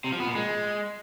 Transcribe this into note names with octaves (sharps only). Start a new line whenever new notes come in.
C3
F3
B3
A#2
G#3